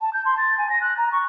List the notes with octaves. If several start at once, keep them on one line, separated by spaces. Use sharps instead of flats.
A5
G6
C6
A6
G#5
A#6
F#6
A#5
C#6